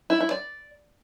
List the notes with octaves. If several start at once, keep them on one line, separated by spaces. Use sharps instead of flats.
E4
E4
D5